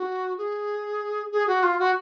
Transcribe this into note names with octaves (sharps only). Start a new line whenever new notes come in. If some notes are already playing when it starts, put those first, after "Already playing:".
Already playing: F#4
G#4
G#4
F#4
F4
F#4